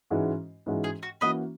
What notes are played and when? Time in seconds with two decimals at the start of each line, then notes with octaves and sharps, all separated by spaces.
0.10 G#2 E3 G#3 C#4 F#4
0.66 G#2 E3 G#3 C#4 F#4
0.84 G#4
1.03 F#4
1.21 E3 A#3 C#4 F#4 B4 D#5